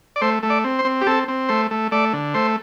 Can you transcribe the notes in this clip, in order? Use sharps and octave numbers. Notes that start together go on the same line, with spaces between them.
D5
A3 C5
A3
D5
C4
C5
C4
G4
C4 A4
C4
A3 C5
A3
A3 D5
D3
A3 C5